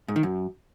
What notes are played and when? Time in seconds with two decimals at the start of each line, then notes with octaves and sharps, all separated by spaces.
0.08 G#2
0.16 D#3
0.23 F#2